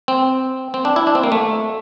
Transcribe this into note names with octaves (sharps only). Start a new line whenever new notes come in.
C4
C4
D4
E4
D4
C4
A#3
A3